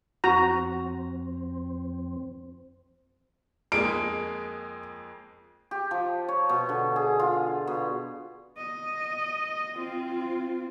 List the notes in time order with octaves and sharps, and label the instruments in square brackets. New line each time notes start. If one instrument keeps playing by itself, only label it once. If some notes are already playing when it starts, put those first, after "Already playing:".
[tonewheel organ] F2 C4 [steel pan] F#4 A#5
[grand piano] F2 G#3 A#3 [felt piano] D7
[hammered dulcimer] G4
F3
C#5
B2
D3
G#4
F4
B2
[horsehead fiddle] D#5
C4 F4